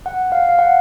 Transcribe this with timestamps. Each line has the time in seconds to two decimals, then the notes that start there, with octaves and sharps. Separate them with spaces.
0.06 F#5
0.32 F5
0.49 F5
0.59 F#5